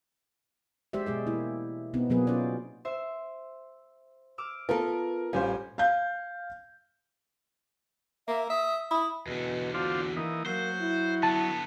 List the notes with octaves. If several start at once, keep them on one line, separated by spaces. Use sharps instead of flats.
G#3 G4 C5 D5 E5
B2 G#3 G#4 D5
A#3 E4
B2 B3 C4 D#4
B2 F#3 A#3 B3 G#4 B4
C#4 D#4 F4 F#4 C5 D5
C5 E5
D6 E6 F6
B3 F4 A4 A#4
A1 G3 C#4 F4 G4 C5 G#5
F5 G6
A#3 E5
E5 D#6
E4 D#6
E2 B2 D3
D4 F4 F#4 C5
E3 A#3 D#4
F#3 A#3 C5
E4
D3 B3 A5